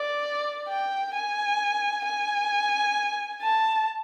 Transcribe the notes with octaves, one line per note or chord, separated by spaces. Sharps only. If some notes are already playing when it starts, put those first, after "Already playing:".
Already playing: D5
G5
G#5
G#5
A5